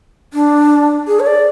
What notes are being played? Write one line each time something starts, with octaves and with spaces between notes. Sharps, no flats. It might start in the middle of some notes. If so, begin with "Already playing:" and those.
D4
G#4
C#5
D5